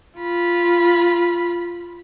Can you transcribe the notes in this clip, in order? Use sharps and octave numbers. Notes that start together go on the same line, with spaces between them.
F4 B5